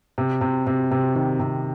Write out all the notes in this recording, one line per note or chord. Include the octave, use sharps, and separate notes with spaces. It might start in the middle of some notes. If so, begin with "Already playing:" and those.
C3
C3
C3
C3
D#3
C3